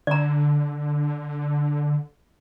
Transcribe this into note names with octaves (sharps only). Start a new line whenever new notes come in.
D3 D5 A#5